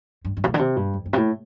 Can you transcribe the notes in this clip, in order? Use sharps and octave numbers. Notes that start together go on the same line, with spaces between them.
G2
G2
C3
A2
D3
C3
G2
F2
G2
C3
A2